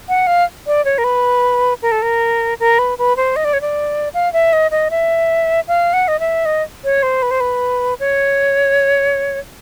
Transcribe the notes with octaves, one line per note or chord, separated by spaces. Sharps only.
F#5
F5
D5
C#5
A#4
B4
A#4
A4
A#4
A#4
B4
B4
C5
D#5
D5
C#5
D5
F5
E5
D#5
D#5
E5
F5
F#5
D#5
E5
D#5
C#5
C5
B4
C5
B4
C#5